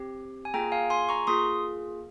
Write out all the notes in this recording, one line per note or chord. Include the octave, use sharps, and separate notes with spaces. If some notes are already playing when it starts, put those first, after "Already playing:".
Already playing: C4 G4
G#5
A#3 F4 G#4 G5 A#5
F5 G#5
G#5 C6
A#5 C#6
A#3 F4 G#4 C6 D#6